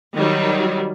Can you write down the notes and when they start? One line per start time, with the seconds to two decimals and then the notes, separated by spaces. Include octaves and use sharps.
0.14 D#3 F#3 G3